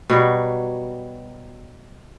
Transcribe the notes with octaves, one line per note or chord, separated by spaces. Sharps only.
B2 F#3 G3